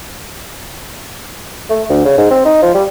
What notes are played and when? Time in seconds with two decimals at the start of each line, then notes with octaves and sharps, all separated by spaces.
1.70 A3
1.89 D2
2.05 C#3
2.18 G#2
2.31 C4
2.45 D#4
2.62 F3
2.74 G3